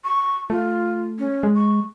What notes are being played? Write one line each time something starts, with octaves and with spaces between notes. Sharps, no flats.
C#6
A3 F4
C#4
G#3
C#6